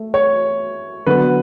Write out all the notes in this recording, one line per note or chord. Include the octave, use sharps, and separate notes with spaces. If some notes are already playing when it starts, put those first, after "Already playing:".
Already playing: A3
C#5
D3 F#3 B3 B4